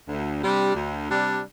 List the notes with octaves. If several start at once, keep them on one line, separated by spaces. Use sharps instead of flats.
D2
C3 G3 D4
D2
C3 G3 D4